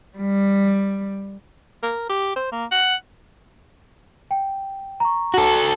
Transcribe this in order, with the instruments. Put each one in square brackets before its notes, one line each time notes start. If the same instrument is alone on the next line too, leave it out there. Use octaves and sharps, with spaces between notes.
[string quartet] G3
[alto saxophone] A#4
G4
C5
A#3
F#5
[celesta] G5
A#5 C#6
[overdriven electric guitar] F#4 A4